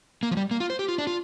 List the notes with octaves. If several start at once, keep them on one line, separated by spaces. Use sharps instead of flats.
A#3
F3
G3
A#3
F4
C5
G4
F4
D4
F4